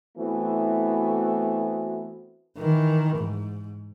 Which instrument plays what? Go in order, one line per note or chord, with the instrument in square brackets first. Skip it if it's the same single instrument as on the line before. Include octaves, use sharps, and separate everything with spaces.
[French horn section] E3 A3 B3 C4 E4 F#4
[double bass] D#3 E3
G#2